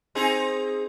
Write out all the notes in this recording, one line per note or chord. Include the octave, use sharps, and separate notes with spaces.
C4 D#4 G#4